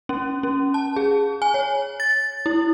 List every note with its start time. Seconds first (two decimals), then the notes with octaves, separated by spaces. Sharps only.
0.09 C#4
0.43 C#4
0.74 A5
0.96 G#4
1.42 G#5
1.54 C#5
2.00 A6
2.46 E4